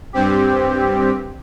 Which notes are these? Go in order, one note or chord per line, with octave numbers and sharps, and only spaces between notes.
G2 C4 G4